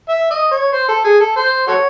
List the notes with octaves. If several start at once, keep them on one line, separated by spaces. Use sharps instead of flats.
E5
D#5
C#5
C5
A4
G#4
A4
C5
F#4 A4 C#5